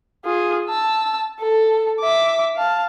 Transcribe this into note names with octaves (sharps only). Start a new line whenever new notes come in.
F4 G#4
A5 E6
A4
E5 D6
F5 A5